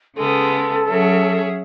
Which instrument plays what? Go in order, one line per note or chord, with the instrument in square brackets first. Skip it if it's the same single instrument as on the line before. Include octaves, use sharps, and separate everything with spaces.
[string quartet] C#3 G#3 B3 [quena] A4
[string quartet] F#3 C#4 G#4 C#5 E5